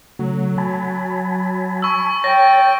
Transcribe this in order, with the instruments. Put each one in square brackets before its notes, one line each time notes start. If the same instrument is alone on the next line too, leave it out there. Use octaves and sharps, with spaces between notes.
[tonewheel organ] C#3 A3 [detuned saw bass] F#3
[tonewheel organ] G#5 A5 B5
[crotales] C#6 E6
[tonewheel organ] C#5 A6 [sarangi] G5 [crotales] A#6